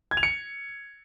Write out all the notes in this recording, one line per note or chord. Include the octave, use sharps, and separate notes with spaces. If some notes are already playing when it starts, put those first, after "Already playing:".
G#6
F7
C#7